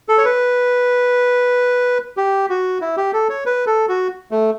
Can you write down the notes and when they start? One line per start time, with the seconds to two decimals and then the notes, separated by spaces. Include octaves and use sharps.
0.09 A4
0.18 C#5
0.25 B4
2.17 G4
2.49 F#4
2.81 E4
2.97 G4
3.13 A4
3.29 C#5
3.46 B4
3.66 A4
3.88 F#4
4.31 A3